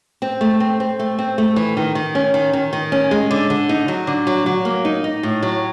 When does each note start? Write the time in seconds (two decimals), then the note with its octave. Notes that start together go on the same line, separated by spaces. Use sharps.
0.22 C4
0.41 A3
0.60 C4
0.80 C4
0.99 A3
1.19 C4
1.38 A3
1.56 E3
1.77 D#3
1.95 D#3
2.15 C#4
2.34 D#3
2.53 D#3
2.73 D#3
2.92 C#4
3.11 G#3
3.31 D3
3.50 D3
3.69 D#4
3.88 F#3
4.07 D3
4.27 F#3
4.46 F#3
4.65 A#3
4.85 D#4
5.04 D#4
5.23 A2
5.43 F#3